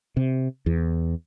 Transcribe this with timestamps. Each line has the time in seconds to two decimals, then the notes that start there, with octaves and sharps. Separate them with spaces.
0.17 C3
0.66 E2